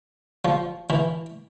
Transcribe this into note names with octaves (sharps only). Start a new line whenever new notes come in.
F3
E3